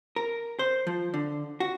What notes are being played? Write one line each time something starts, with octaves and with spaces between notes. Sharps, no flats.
A#4
C5
F3
D3
F#4